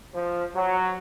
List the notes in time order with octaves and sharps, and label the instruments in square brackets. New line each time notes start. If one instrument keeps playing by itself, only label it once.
[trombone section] F3
F#3